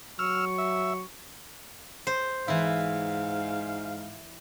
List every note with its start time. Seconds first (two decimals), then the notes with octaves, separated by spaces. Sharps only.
0.19 F#3 C#6 E6 F6
0.58 E5
2.07 C5
2.48 G#2 E3 E4 F5